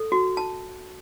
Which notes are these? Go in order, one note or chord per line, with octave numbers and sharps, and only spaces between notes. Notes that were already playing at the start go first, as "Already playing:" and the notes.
Already playing: A4
F#4
A5